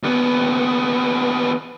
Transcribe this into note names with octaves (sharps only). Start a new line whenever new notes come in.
D#2 B3